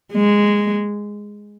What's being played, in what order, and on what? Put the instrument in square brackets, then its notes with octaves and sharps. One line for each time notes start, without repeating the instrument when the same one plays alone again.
[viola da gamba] G#3